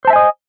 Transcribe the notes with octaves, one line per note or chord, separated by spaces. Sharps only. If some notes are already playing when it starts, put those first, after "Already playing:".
C5 D#5 E5 G#5 A5